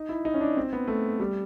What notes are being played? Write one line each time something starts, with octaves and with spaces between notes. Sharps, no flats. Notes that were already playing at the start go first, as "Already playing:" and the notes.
Already playing: D#4
E4
D#4
C#4
D4
C4
B3
A3
G3